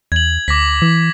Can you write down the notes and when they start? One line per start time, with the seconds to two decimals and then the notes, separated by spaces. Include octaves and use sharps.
0.12 E2 G#6 F#7
0.48 D2 D6 A#6 B6
0.82 E3